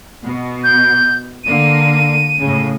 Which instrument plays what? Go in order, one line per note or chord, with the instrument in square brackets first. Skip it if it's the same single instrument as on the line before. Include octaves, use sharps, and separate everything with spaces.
[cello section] B2
[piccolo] G6
[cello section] D3 A#3 [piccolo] D#7
[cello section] A2 C#3